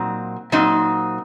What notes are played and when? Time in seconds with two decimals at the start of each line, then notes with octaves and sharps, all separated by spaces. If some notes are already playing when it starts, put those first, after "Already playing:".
Already playing: A#2 F#3 C4 D#4
0.52 A#2 F#3 C4 D#4